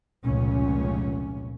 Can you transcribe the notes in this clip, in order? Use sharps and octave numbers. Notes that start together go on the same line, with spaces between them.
F1 C#2 A#2 C#4